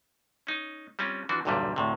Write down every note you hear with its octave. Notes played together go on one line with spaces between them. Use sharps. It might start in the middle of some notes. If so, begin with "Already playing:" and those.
C#4 D#4
G3 C4 C#4 F4
E3 F3 D4 F#4
B1 E2 G2 A#2 D3 G3
D2 A2 C3